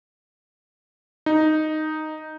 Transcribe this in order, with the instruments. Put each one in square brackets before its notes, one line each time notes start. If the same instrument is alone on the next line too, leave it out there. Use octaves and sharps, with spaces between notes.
[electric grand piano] D#4